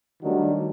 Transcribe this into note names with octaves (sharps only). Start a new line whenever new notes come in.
D#3 F#3 G3 A3 D4 F#4